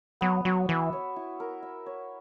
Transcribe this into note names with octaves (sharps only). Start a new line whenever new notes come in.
F#3 B3
F#3 F#4
E3 E5
C#5
E4
A#4
E5
C#5